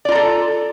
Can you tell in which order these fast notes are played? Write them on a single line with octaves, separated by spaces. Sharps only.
D5 F4 A#5 A4